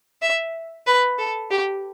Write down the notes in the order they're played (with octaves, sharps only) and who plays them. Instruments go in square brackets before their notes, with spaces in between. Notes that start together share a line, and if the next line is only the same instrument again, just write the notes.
[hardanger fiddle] E5
B4
A4
G4